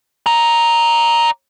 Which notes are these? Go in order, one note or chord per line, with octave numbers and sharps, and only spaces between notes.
D5 A#5